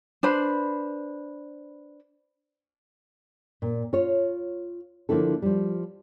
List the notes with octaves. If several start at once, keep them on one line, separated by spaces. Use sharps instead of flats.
D4 B4 C5 B5
A#2
F4 C#5
D3 F3 A#3 E4 A4
F3 G3